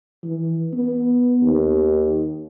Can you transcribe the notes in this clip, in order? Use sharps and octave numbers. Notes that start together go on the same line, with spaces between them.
E3
B3
D#2